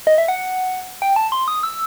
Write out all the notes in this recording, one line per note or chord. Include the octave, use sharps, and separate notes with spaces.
D#5
E5
F#5
G5
A5
C6
D#6
E6